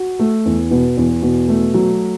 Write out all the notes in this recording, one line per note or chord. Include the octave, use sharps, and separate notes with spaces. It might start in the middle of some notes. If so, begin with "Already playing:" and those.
Already playing: F#4
A3
E2
B2
E2
B2
A3
F#3